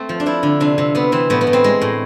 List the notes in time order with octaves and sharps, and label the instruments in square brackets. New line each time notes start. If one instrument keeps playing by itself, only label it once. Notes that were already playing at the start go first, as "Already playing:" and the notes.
Already playing: [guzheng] A3 C4
F3
D4
F3 E4
D3
C3 D4
C3
C3 B3
E3 C4
A2 B3
B3
A2
C4
G#3
A2